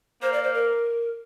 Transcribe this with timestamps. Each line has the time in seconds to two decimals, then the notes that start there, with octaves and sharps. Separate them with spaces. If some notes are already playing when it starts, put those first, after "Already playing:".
0.22 A#3 C5
0.33 D5
0.43 C5
0.54 A#4